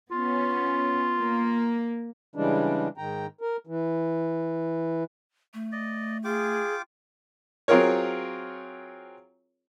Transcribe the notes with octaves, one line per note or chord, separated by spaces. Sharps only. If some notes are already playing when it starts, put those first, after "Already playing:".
B3 C#4 F4
A#3
C#3 E3 G3 G#3 D4
G#2 D#3 G5 A#5
A#4
E3
A3
D5 D#5
F4 G#4 G5 D6
F#3 C4 F4 G#4 A#4 C#5